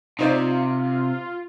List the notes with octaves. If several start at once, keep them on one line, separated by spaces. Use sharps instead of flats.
C3 D#4 F4 C5 D5